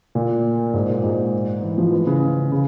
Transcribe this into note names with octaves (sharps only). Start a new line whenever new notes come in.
A#2
G#2
A#2
G#2
E3
F3
E3
C#3
C#3